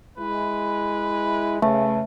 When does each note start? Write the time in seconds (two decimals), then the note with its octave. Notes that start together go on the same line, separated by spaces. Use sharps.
0.18 G#3 E4 B4
1.62 C#3 A3 B4 E5 A5